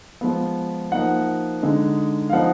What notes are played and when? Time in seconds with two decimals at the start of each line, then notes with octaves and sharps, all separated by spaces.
0.21 F3 G#3 B3
0.92 F3 A#3 D#4 F#5
1.63 D3 G#3 D#4
2.30 F5
2.33 F3 B3 D#4 F#5